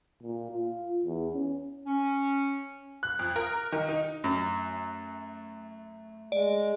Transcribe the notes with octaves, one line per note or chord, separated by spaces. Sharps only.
A#2
F4
E2
C#4
C#4
F#6
F2
A#4
D#3
D#4
F#2 A3
G#3 D5